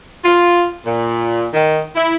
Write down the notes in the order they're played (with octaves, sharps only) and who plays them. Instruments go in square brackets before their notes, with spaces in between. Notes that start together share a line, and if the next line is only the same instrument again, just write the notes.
[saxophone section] F4
A#2
D#3
E4